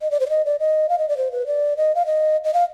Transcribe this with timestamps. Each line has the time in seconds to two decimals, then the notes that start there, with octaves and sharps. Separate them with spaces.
0.01 D#5
0.11 D5
0.20 C5
0.27 D5
0.30 D#5
0.45 D5
0.59 D#5
0.89 F5
0.98 D#5
1.09 D5
1.17 C5
1.32 B4
1.46 D5
1.77 D#5
1.95 F5
2.06 D#5
2.44 D#5
2.54 F5